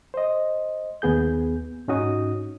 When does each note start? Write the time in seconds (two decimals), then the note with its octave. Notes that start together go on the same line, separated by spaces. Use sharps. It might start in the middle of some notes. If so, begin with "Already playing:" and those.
0.14 C5 D#5
1.02 D#2 B3 G#4 G6
1.88 G#2 C#4 D#4 F#4 D#6